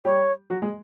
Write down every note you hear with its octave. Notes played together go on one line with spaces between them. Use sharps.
G3 G4 C#5
F#3 F#4
G#3 G#4